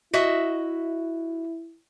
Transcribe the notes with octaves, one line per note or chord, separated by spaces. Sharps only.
E4 F#4 D#5 E5